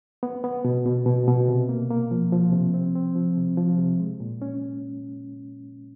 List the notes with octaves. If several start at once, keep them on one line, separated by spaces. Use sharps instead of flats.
B3
B3
B2
B2
B2
B2
C3
A#3
A#3
F3
F3
C3
C4
C4
F3
C3
F3
C3
G#3
A#2
C#4